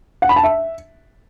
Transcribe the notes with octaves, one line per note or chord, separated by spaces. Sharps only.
F#5
B5
A5
E5